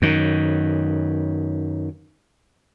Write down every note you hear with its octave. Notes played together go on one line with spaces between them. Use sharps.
F#2 D#3